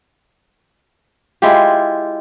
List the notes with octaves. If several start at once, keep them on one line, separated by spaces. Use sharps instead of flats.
G#3 E4 F4 G4